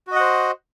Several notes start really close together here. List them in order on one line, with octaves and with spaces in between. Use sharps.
F#4 D#5 F#5 C5